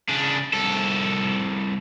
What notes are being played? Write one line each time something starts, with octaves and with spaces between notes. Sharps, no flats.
C#3 D4
C2 A4